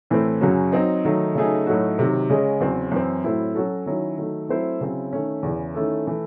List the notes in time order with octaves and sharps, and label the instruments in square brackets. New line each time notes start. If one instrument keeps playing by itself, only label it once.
[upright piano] A2 E3 A3 C4
F#2 C#3 F#3 C#4 F#4
F#3 C4 D#4
D#3 F#3 A3 D#4
C#3 F#3 A3 D#4 G#4
A2 F#3 A3 D#4 F#4
C3 D#3 F#3
C#3 G#3 C#4 G#4 D#5
E2 C#3 F#3 C4
F#2 E3 C4
A2 F#3 C4 E4 A4
F#3 C#4 F#4 A4
D#3 F#3 C#4 E4
D#3 F#3 A3
F#3 A3 C4 E4 C5
C#3 F#3 C4 E4
D#3 A3 C#4
E2 C#3 E3
D#3 A3 C#4 E4 A4
E3 A3